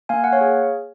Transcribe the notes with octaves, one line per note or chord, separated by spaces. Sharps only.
A#3 F5 G#5
A#3 F#5
C#5 F5
G#4